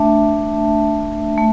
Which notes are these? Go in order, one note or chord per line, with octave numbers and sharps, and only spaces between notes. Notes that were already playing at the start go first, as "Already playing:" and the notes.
Already playing: A3 D4 E5 A5
A3